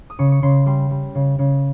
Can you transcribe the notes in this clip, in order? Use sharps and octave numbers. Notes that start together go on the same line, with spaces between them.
D#6
C#3 C#6
C#6
C#3 C6
G3 C6
G3
C#3
C#3